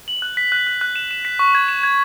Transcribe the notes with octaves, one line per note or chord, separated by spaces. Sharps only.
F#7
F#6
B6
F#6
F#6
F#6
E7
E7
B6
C#6
G#6
E7
G#6